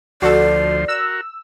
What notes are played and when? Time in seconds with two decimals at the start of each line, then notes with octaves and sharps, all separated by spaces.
0.22 D2 F3 F#4 A4 C5 D5
0.88 F#4 A#4 E6